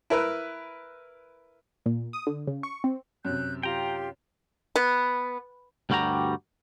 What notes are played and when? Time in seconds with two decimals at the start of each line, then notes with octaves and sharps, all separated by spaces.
0.10 E4 A#4 B4
1.86 A#2
2.13 D#6
2.27 D3
2.47 C#3
2.63 C#6
2.84 C4
3.25 F#2 C3 F#6 G6
3.63 F4 G4 G5 A#5 C6
4.76 B3
5.90 D2 G2 G3 F#4 G4 A#5